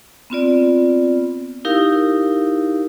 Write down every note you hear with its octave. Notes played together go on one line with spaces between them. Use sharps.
B3 C4 F4 D5
D#4 E4 G4 A#4 F5